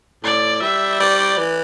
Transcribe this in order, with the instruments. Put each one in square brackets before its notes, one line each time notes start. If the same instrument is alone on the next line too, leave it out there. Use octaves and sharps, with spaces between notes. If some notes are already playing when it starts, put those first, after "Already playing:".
[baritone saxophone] A2 [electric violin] D5
[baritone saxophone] G3 [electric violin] E5
[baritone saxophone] G3 [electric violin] D5
[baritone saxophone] E3